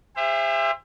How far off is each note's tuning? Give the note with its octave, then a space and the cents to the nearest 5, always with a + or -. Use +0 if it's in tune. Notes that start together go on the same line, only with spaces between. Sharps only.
G#4 -45 C5 +0 E5 +25